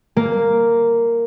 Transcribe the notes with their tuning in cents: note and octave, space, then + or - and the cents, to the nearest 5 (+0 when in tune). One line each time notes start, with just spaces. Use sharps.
A#3 -5